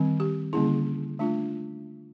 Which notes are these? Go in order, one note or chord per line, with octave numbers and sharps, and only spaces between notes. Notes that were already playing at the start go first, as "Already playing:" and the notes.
Already playing: D#3 G3 C4
G4
D3 G3 A#3 C#4 E4 G#4
A3 D4 F4